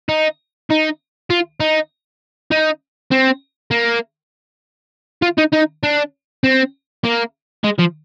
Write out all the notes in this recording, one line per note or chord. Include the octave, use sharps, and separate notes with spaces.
D#4
D#4
F4
D#4
D#4
C4
A#3
F4
D#4
D#4
D4
C4
A#3
G#3
F3